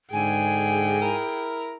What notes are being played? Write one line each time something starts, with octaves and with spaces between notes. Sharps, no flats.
G#2 D3 G#4 G5 G#5
E4 A#4